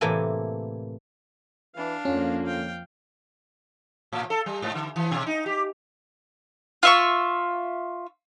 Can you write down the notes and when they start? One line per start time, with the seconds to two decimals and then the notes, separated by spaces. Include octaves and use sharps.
0.01 A2 C3 E3 A#3 A4 G#5
1.75 E3 D4 F5
2.05 F2 D3 F3 A#3 C#4 F4
2.45 F5 G5
4.13 A2
4.30 A4
4.46 G3
4.62 G#2
4.75 D3
4.96 E3
5.11 B2
5.27 D#4
5.46 G4
6.83 F4 E5 C#6